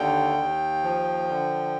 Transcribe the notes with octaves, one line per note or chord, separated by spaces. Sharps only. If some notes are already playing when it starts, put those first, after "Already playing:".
Already playing: D#2 D3 G5
D#2
F3
D3